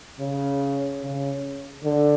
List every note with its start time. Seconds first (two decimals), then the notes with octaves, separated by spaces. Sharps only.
0.19 C#3
1.03 C#3
1.84 D3